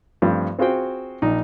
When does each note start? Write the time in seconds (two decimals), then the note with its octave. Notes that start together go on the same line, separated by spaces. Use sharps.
0.22 G2 F3 A3 C4
0.59 C4 F4 F#4 G#4 C5 G5
1.22 A#1 D#4